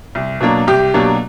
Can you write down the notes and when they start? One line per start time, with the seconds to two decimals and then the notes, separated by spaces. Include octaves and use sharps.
0.15 C2
0.41 B2 F#3 A#3 D4
0.67 C2 G4
0.94 B2 F#3 A#3 D4